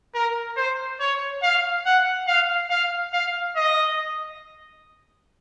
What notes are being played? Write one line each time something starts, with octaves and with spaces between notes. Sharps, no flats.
A#4
C5
C#5
F5
F#5
F5
F5
F5
D#5